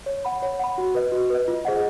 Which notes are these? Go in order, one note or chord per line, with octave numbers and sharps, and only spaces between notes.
C#5
F#5 B5
C#5
F#5 B5
F#4
B4 D#5
F#4
B4 D#5
F4
G#4 C5 D#5 F#5